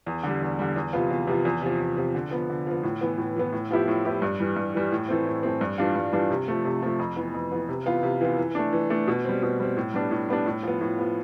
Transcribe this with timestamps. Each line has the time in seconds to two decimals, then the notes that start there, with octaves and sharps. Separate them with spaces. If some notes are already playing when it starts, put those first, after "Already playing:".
0.06 E2
0.24 D3 G3
0.42 E2
0.59 D3 G3
0.76 E2
0.93 C3 F3 B3 F4
1.10 E2
1.27 C3 F3 B3 F4
1.45 E2
1.62 C3 F3
1.80 E2
1.97 C3 F3
2.15 D3
2.31 F3 B3
2.50 D3
2.67 F3 B3
2.83 A2
3.01 E3 B3
3.18 A2
3.36 E3 B3
3.53 A2
3.71 F3 B3 E4 G4
3.88 A2
4.05 F3 B3 E4 G4
4.22 G2
4.40 E3 G3
4.56 G2
4.74 E3 G3
4.92 A2
5.09 E3 A3 C4
5.27 A2
5.43 E3 A3 C4
5.61 G2
5.78 E3 G3 D4 F4
5.96 G2
6.13 E3 G3 D4 F4
6.31 C3
6.48 F3 A3
6.65 C3
6.83 F3 A3
6.99 F2
7.17 E3 B3
7.34 F2
7.52 E3 B3
7.69 C3
7.86 E3 B3 F4
8.03 C3
8.21 E3 B3 F4
8.38 E3
8.55 A3 D4
8.73 E3
8.90 A3 D4
9.08 B2
9.25 G3 C4
9.42 B2
9.60 G3 C4
9.77 A2
9.94 G3 B3 D4
10.11 A2
10.29 G3 B3 D4
10.46 A2
10.63 F3 B3
10.81 A2
10.98 F3 B3